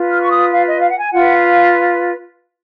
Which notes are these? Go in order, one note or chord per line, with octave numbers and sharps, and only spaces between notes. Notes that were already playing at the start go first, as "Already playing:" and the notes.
Already playing: F4 B4
F6
C#6
D#6
F5
D#5
F5
F#5
G#5
F4 B4 F#5
F5